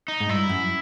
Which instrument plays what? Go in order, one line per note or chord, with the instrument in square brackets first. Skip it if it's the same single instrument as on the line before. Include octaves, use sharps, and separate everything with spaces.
[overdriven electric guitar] D#4
[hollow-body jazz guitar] G#2
[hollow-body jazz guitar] G2 [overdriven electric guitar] E4
[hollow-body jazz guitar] F#2